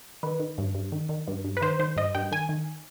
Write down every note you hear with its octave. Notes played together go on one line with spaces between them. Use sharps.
D#3 B4
D#3
G2
G2
D#3
D#3
G2
G2
B4
D#3 C5
D#3 C5
G2 D#5
G2 G5
D#3 G#5
D#3